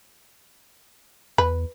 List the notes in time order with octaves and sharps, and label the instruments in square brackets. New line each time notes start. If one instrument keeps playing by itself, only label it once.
[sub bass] E2 [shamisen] B4